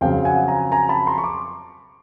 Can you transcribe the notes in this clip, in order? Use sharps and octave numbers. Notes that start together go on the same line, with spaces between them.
F2 C#3 F#3 F5 G5
F#5 G#5
G#5 A#5
G#5 A#5
A5 B5
A#5 C6
C#6
D6